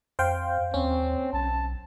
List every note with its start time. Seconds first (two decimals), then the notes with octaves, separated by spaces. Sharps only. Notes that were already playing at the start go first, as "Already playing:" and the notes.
0.19 F2 C5 F5 G5
0.74 D#2 C4 C#4
1.33 B1 A5